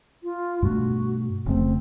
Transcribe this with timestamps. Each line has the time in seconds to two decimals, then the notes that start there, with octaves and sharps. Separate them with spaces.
0.23 F4
0.62 G2 B2 A3 F#4
1.46 F1 C#3 A3 C4